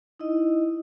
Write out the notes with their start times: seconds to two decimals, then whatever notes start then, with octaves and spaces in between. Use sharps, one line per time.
0.20 D#4 E4 D#5